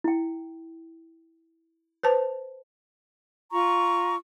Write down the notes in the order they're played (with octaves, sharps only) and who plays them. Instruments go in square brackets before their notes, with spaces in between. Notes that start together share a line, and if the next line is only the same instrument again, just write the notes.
[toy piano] E4 G5
[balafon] B4 C5 A5
[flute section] F4 A#5 C#6